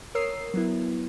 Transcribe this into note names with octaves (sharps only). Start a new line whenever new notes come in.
A#4 C#5 D#6 E6 C7
F#3 B3 E4